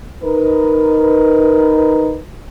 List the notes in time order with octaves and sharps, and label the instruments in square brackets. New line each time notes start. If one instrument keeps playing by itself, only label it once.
[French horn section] D#4 A#4 B4